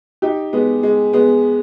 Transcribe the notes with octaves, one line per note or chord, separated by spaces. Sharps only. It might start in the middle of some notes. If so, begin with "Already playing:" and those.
D#4 G4
G#3 B3
G#3
G#3 B3